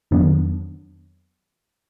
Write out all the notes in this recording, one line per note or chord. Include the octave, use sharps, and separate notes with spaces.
F2 D#3 F#3 B3 D4